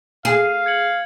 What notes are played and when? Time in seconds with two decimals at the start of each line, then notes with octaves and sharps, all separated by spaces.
0.25 G#4 F5
0.66 G#6 C#7 F#7